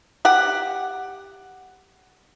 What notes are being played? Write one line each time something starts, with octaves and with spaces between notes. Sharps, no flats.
G4 F#5